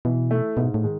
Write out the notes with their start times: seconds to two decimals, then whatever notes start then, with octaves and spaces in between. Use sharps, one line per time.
0.05 B2 E3
0.31 A3 E4
0.57 G#2 B2
0.74 A2
0.83 D#3 G#3